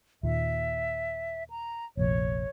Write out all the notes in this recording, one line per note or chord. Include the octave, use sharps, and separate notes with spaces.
D#2 A#2 E5
A#5
F1 A#1 C#5